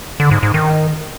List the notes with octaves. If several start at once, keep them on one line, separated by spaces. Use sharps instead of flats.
D3
G#2
G#2
D#3